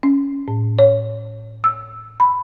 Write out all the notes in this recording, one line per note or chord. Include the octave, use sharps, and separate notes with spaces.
C#4
A2
C#5
E6
B5